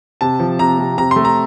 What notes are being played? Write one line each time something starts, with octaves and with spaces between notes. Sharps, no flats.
C3 A5
F3
C3 A#5
C3
C3 A#5
A3 C6
A#5